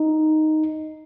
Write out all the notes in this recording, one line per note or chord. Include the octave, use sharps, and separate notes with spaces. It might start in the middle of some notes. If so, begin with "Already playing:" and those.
Already playing: D#4